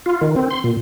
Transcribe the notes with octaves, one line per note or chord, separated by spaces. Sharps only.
F4
D#3
C4
C6
A#2